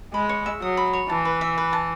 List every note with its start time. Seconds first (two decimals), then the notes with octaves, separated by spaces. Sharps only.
0.14 G#3 B5
0.29 C#5
0.46 E5
0.61 F#3 D#6
0.77 B5
0.93 C#5
1.09 E3 A5
1.25 B4
1.41 E5
1.58 B4
1.73 A5